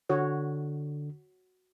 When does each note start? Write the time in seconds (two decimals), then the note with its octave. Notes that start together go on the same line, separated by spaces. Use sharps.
0.09 D3 F#4 C#5